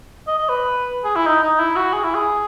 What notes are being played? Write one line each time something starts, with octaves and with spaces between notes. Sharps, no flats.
D#5
D#5
B4
G#4
E4
D#4
D#4
E4
F#4
G#4
E4
G#4